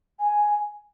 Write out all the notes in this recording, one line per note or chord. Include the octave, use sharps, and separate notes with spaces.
G#5